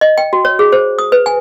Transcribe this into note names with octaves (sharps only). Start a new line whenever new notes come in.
D#5
G5
F#4
C#5
G#4
C5
D#6
B4
G#5